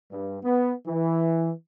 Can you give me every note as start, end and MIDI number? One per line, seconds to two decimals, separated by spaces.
0.11 0.38 43
0.43 0.72 59
0.86 1.51 52